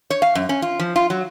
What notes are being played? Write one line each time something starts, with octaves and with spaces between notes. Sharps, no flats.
C#5
F5
F#2
C#4
F4
F3
F4
F#3